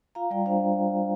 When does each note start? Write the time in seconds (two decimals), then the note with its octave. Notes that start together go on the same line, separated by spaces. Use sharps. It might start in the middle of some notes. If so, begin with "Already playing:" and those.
0.15 F4 F5 A#5
0.30 G3 D5 G5
0.46 D4 C5 F5